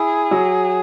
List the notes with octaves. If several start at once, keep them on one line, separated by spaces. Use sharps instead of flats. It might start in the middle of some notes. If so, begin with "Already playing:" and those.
Already playing: E4 G#4
F#3